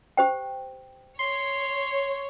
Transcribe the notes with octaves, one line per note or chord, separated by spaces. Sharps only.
G4 C5 G5
C#5 C6